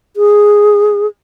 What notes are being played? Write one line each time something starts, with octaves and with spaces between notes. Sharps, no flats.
G#4